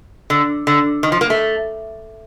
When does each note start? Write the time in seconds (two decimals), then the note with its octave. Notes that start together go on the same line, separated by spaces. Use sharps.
0.30 D3
0.67 D3
1.03 D#3
1.12 F3
1.21 A#3
1.30 A3